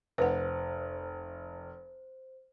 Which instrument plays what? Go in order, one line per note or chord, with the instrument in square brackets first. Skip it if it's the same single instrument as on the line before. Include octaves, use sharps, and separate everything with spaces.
[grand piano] F1 [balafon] B4 F#5 [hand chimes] C5